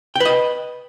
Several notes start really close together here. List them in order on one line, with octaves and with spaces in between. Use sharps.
G5 B4 D#5